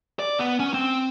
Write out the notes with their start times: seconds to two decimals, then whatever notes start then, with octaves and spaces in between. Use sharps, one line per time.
0.19 D5
0.39 B3
0.60 C#4
0.74 C4